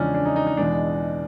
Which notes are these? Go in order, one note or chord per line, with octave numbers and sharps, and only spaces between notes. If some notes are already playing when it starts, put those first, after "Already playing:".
Already playing: E2 C#3 F3 G#3 C#4 D4
D4
D#4
D#4
D#4
E2 B2 G#3 D4